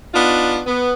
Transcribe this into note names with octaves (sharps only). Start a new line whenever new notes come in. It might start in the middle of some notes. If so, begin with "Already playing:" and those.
B3 D4 D#4 F4
B3